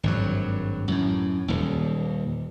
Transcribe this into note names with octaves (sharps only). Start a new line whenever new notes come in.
G#1 G2 F#3
F#2 A2
D#1 D#2